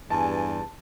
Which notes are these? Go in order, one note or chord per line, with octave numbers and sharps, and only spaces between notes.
E2 G2 G#5 A5